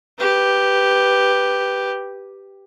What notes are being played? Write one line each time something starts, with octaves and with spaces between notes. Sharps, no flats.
G4 B4